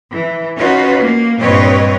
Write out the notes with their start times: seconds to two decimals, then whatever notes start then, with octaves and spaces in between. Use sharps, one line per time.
0.12 E3
0.58 C#4 D#4 F4 F#4 B4
1.01 A#3
1.39 G2 A#2 C4 B4 C#5 D#5